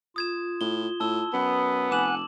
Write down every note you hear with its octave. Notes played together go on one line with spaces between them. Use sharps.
F4 D#6 G#6 E7
A2 G7
A2 A5 E6 G7
F#2 B3
F1 F#5 G#5 D6 F#6 E7 F#7